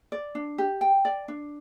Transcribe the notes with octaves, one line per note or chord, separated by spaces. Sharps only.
D5
D4
G4
G5
D5
D4